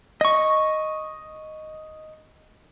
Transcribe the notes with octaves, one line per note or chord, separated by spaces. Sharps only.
D#5 C#6